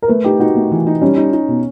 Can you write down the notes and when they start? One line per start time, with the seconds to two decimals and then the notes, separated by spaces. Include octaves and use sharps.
0.02 A#4
0.08 A3 B4
0.24 D#4 G4
0.40 D#4 F#4
0.56 A3
0.71 E3
0.87 D#4
1.02 G3 C#4
1.17 D#4
1.33 D#4
1.48 B2